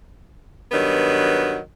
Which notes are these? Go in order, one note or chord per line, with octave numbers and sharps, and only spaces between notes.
G2 D#3 F#3 B3 F#4